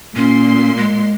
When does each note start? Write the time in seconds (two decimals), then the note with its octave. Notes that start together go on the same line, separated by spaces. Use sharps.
0.16 A#2 C#4 C6
0.77 G#3